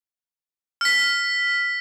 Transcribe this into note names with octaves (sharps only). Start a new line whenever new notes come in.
F6 B6